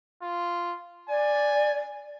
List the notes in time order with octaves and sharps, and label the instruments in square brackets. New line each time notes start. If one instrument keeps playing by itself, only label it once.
[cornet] F4
[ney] D5 [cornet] G#5